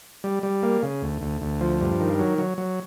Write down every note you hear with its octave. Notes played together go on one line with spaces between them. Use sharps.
G3
G3
A#3
C#3
D2
D2
D2
F3
G2
D#3
F#3
F#3
F#3